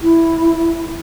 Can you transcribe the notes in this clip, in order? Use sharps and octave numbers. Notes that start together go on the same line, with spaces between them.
E4